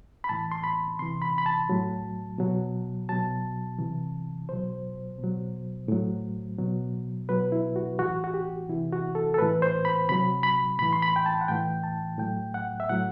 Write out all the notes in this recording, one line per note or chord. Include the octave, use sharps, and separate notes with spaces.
B5
A2 E3 A5
C6
B5
C3 E3 C6
B5
B5
A5
A2 F#3
B2 F#3
B2 F#3 A5
C3 E3
B2 F#3 C5
B2
F#3
A2 F#3
B2 F#3
B2 F#3 B4
E4
F#4
A2 E3 F#4
F#4
G4
C3 E3 E4
F#4
A4
A4
A2 E3 B4
C5
B5
C3 F#3 B5
B5
A2 E3 B5
C6
B5
G5
A5
F#5
A2 E3 G5
A5
A2 F#3 G5
F#5
E5
A2 F#3 F#5